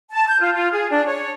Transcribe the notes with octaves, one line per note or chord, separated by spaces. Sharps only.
A5
G6
F4
F4
G#4
D4
C#5